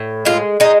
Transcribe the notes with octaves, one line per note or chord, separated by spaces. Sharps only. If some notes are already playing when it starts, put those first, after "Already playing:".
Already playing: A2
G#3 F4
G#3 D#4